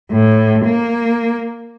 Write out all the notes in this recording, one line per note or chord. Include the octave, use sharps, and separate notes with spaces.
A2
A#3